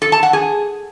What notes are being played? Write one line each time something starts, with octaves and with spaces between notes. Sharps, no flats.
A4
A5
F#5
G#4